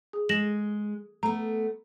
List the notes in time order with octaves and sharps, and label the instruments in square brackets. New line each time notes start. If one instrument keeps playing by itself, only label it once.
[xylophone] G#4
[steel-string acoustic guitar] G#3 [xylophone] A#6 E7 F#7
[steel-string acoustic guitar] A3 B3 [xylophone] A#5